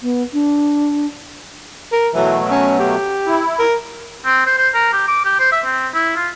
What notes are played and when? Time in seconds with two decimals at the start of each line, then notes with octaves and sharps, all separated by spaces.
0.02 B3
0.33 D4
1.92 A#4
2.14 B2 E3 F#3 A3
2.51 C#4
2.79 G4
3.26 E4
3.59 A#4
4.26 C4
4.46 C5
4.58 C5
4.74 A#4
4.93 G4
5.08 D6
5.25 G4
5.40 C5
5.52 E5
5.66 C4
5.95 E4
6.16 F4